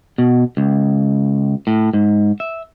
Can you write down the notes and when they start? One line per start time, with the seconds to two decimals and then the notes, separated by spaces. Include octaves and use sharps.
0.18 B2
0.57 C#2
1.67 A2
1.93 G#2
2.40 E5